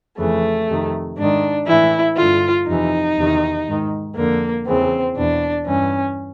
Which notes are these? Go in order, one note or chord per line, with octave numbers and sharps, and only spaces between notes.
F2 C#3 E3 A3
F2 C3 D#3
G#2 D#3 D4
E3 E4
A2
G2 D3 F4
F2 C3 E3 D#4
E2 C3 D#3
G#2 D#3
F2 D3 A#3
E2 C#3 E3 C4
E2 B2 D4
G2 E3 C#4